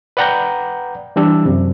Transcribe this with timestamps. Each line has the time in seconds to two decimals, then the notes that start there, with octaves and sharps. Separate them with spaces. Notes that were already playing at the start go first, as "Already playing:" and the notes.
0.17 B4 D5 F#5 G5 A#5 G6
1.16 E3 G3 D4 E6
1.45 F#2 C3